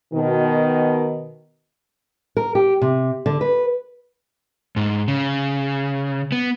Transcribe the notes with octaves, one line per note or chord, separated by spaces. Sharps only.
B2 D#3
A#4
G4
C3
D3
B4
G#2
C#3
B3